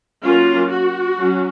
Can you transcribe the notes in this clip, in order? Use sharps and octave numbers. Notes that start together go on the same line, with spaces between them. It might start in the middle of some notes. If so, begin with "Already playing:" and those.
F#3 A#3 C#4 F4
F#4
F#3 C#4